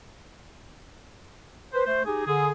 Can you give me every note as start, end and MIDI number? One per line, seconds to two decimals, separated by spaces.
1.73 1.82 71
1.73 1.82 72
1.86 2.03 57
1.86 2.03 72
2.05 2.24 63
2.05 2.24 67
2.05 2.24 68
2.27 2.50 50
2.27 2.50 68